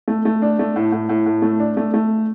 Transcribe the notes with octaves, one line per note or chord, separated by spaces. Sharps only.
A3
A3
D4
A3
A2
A2
A2
A2
A3
D4
A3
A3